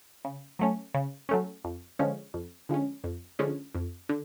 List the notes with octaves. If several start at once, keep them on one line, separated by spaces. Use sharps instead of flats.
C#3
F#3 A3 C#4
C#3
F#3 A3 C#4
F2
D3 F3 G#3 C#4
F2
D3 F3 G#3 C#4
F2
D3 F3 G#3 C#4
F2
D3